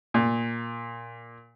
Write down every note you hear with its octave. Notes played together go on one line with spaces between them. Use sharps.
A#2